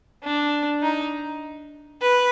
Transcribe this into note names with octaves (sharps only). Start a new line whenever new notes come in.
D4
D#4
B4